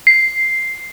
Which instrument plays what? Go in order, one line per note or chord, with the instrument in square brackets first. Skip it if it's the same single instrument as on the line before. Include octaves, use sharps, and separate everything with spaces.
[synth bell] C7